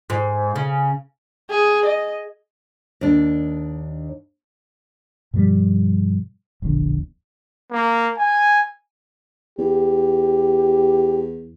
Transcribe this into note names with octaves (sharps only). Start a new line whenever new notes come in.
G#2
C#3
G#4
D#5
D#2 D4
G2 B2 F3 G3
E1 A#1 E2 D3
A#3
G#5
E2 G4